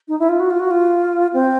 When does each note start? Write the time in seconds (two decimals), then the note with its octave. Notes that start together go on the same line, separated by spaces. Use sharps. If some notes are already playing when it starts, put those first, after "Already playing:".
0.08 D#4
0.19 E4
0.29 F4
0.40 F#4
0.50 F4
0.60 F#4
0.71 F4
1.33 C4